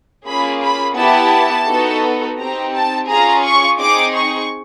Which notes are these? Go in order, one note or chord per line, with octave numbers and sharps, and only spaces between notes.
A#3 C#4 F4 G#4 B5
B5
B3 E4 G4 A5
B3 D#4 F#4 A4
C4 D#4 G4 A#5
A5
C#4 F4 G#4 A#5
C#6
C4 D#4 G#4 D6
C#6